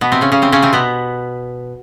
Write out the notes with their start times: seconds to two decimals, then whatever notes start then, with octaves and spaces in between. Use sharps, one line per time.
0.01 B2 B3
0.12 C3 C4
0.21 C#3 C#4
0.32 C#3 C#4
0.42 C3 C4
0.52 C#3 C#4
0.62 C3 C4
0.73 B2 B3